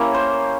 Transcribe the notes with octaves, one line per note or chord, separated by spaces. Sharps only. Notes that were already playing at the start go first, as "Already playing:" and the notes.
Already playing: A#3 C#4 E4 G4 A#4
C5